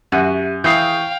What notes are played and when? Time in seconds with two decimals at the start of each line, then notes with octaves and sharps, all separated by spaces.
0.12 F#2 F#4 G4 E5 D#7
0.64 E3 G#4 F5 G5 C#6 G6